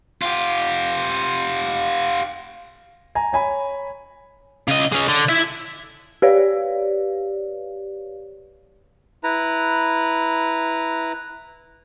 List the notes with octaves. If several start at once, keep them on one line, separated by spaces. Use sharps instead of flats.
F4 G4
G#5 A#5
C#5 G#5 B5
C#3 D#5
G#3 C#4
D3
E4 E5
G4 B4 C#5 D5 F5
E4 B4 A#5